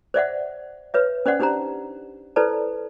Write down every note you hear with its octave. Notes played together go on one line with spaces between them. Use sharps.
C5 D5 E5 F#5
B4 C#5 E5
C#4 C5 D5 F#5
D4 D#4 G4 C5 A#5
E4 A4 B4 C5 D5 A5